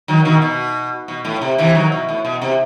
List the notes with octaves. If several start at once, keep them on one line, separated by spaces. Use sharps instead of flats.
D#3 F#3
B2 D#3
B2
B2
A2
C3
C3 E3
D#3 F#3
B2
A2
B2
C3